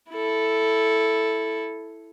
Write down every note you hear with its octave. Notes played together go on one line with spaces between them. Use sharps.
E4 A4